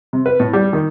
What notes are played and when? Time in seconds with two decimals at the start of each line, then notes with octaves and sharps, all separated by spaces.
0.13 C3
0.26 B4
0.40 A2
0.53 G3
0.73 D#3